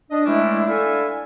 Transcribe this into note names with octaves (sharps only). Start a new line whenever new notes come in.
D4 D#5
E3 G#3 A3 C#4 D4 E4
D4 E4 A4 E5 F5 G#5